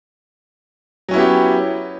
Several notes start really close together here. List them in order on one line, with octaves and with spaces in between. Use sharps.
F#3 C#4 E4 B3 G4